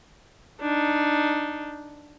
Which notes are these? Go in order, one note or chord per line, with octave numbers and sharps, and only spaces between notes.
D4 D#4